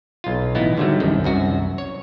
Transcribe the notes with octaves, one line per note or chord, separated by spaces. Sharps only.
B1 F4
A1 B3 D#4 E4
G#2 D3 D#3 F#3 G3 A3
C2 F#2 D#3
C2 F#2 F#4
C#5